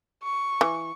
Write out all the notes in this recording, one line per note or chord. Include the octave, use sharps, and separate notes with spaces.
C#6
E3